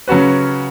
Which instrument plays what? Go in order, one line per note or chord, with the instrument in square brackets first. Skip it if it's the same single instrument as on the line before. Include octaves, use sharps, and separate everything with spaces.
[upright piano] C#3 F#3 C#4 F#4 B4